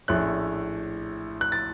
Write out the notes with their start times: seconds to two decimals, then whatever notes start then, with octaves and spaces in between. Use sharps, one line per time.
0.08 A#1 A2 A3 C#4 F#6
1.41 F#6
1.52 A6